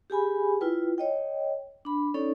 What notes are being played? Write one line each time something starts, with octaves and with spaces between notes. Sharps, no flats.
G4 G#4 G#5 B5
E4 F4 B4 G5
C#5 D#5 G5
D4 B5
C#4 D#4 A4 C#5 D5